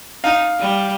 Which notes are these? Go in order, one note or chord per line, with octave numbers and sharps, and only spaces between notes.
D#4 F5
G3